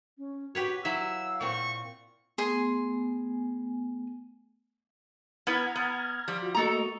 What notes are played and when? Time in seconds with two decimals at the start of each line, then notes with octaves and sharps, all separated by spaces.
0.18 C#4
0.55 F#4 G4 B4 C#5
0.85 F#3 E4 E5 F5 E6
1.41 A#2 C4 C#6
2.38 A3 B3 G#4 G#5 C6
5.47 B3 E4 B4 A#5 F6 G#6
5.76 B3
6.28 F3 G3
6.42 F4 F#4
6.55 A3 A#3 F#4 A4 D#5 A#5